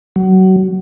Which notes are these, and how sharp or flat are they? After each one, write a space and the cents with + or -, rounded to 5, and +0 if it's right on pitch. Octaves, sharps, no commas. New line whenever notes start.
F#3 +25